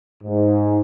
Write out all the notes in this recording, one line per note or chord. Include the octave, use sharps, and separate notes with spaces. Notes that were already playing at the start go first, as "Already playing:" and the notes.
G#2